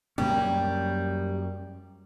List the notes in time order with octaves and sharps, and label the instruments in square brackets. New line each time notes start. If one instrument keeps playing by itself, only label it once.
[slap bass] F#2 A#3 C#4 [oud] G3